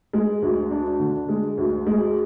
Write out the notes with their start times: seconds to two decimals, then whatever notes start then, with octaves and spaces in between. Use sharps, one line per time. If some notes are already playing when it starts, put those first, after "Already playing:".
0.13 G#3
0.42 D2
0.71 D4
1.00 D3
1.29 G#3
1.58 D2
1.87 G#3